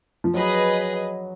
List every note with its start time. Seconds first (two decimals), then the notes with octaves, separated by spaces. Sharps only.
0.24 F3
0.34 F#3 G#4 B4 D#5